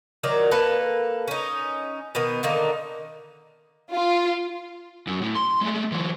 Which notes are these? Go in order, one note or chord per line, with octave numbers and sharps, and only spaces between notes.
D#3 F#3 A#4 D5
A#3 A4 B4
C#4 D#4
B2 D#3 B3
D3 D#3 A#3 D#4
F4
F#2
A2
C6
G#3 A3
E3 F#3